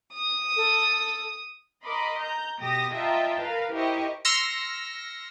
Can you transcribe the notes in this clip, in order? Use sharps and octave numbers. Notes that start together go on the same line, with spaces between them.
D#6
A4
A#4 D#5 B5 C6 D6
A#5 G6
B2 G4 D#6 A#6
F4 D#5 E5 G5 A5 A#5
A#4 B4 F5
E4 G4 A#4 C5 D#5 C#6
C6 E6 F6 A#6 C#7